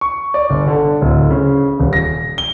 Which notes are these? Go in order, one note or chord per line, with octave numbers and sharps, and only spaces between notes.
C#6
D5
G1
D3
D1
C#3
D#1
A#6
G7